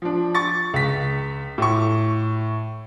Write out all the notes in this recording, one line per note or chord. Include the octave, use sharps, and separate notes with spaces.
F3 D4
C#6 A6
C#2 B6
A2 C#6